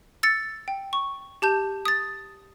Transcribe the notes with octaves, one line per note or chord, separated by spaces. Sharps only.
E6 A6 C#7
G5
C#6
G4 A5 G6
D#6 A6